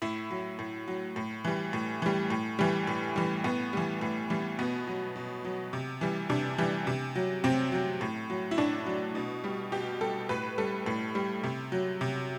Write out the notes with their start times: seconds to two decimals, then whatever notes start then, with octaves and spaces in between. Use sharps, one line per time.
0.02 A2 E4
0.31 F#3
0.59 A2
0.88 F#3
1.16 A2
1.45 E3 G3
1.73 A2
2.02 E3 G3
2.30 A2
2.59 E3 G3
2.87 A2
3.16 E3 G3
3.44 A2 B3
3.73 E3 G3
4.01 A2
4.30 E3 G3
4.59 B2 B3
4.87 F#3
5.16 B2
5.45 F#3
5.73 C3
6.01 E3 G3
6.30 C3 D4
6.58 E3 G3
6.87 C3
7.15 F#3
7.44 C3 C4
7.72 F#3
8.01 A2
8.30 F#3
8.51 E4
8.58 A2 D4
8.86 F#3
9.15 B2
9.44 G3
9.72 B2 G4
10.01 G3 A4
10.29 A2 B4
10.58 G3 A4
10.86 A2
11.15 G3
11.43 C3
11.72 F#3
12.01 C3